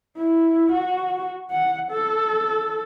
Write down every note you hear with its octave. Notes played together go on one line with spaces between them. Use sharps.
E4
F#4
F#5
A4